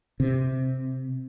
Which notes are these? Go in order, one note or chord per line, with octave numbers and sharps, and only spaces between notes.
C3